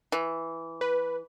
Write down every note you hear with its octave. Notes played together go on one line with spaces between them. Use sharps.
E3
B4